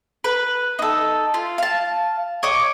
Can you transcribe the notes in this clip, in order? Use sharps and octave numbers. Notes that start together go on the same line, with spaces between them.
B4
D#4 A4
F4
F5 A5
C#5 D#5 D6